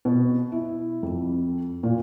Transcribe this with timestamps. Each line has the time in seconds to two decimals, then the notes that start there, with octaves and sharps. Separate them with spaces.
0.05 B2
0.52 E4
1.03 F2
1.83 A#2